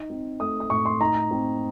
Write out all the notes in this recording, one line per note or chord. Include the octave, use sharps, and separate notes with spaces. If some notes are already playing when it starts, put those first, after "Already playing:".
Already playing: D#4
C4
A3 D#6
D#6
A2 C#6
C6
D#4 A#5
C4